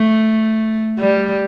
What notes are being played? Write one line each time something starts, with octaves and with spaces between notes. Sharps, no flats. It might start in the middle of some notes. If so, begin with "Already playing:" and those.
Already playing: A3
G3